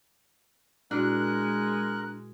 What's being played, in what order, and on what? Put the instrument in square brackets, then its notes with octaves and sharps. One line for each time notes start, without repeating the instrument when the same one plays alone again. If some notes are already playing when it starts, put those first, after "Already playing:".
[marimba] A#2 E4 F#4 [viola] G#3 [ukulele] D4 [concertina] A#4 F#6